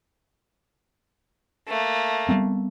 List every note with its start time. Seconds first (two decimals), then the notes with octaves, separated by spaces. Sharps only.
1.67 A3 A#3
2.29 G3 B3 C4